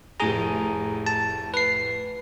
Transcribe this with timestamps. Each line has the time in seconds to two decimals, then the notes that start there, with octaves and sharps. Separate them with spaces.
0.20 F1 A2 G#4 A#5 D#7
1.06 A5
1.54 B4 C7